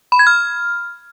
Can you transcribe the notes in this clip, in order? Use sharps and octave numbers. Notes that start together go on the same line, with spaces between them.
B5
G#6
F6